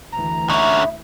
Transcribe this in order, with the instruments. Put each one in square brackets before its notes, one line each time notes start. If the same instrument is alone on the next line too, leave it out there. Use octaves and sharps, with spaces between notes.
[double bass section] D2 E3 [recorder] A#5
[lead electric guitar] D3 C#4 [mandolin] D#4 E4